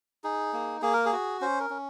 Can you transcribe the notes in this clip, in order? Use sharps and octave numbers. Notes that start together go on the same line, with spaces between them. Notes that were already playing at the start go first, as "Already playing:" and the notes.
D#4 G#4
A#3
A#3 G#4
A#4
G#4
F#4
C#4 C5
A#4
C#4